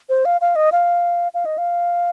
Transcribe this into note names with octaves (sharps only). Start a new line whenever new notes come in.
C5
F5
F5
D#5
F5
F5
D#5
F5